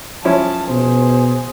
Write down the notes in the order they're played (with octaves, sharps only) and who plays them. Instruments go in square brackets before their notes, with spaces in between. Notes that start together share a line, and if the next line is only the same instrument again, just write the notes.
[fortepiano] F3 C#4 E4 [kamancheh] A5
[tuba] B2 [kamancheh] G#4 C5